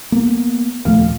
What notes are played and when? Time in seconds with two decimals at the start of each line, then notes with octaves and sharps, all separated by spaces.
0.12 A#3 B3
0.85 D#2 A#2 F3 A3